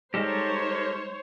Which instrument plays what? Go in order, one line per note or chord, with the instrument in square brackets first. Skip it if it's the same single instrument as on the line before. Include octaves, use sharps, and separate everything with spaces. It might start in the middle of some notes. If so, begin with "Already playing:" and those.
[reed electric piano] G3 G#3 [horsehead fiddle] D#4 [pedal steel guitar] G4 A4 A#4 [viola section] C5 C#5